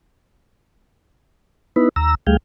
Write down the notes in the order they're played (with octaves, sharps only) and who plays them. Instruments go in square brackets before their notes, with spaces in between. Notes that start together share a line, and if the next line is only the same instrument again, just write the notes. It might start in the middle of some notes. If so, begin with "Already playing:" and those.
[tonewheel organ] B3 D#4 E4 B4
D#2 A#5 E6
D2 G3 A3 G#4 F5 G5